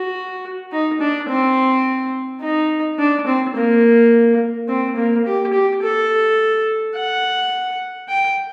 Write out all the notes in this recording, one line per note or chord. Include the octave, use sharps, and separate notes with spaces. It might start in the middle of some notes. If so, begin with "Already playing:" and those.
Already playing: F#4
D#4
D4
C4
D#4
D4
C4
A#3
C4
A#3
G4
G4
A4
F#5
G5